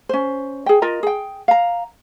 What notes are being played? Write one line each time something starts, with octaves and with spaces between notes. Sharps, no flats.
C#4 C5
G#4 G5
F4 A#4 D#5 A#5
G#4 G5
F5 A#5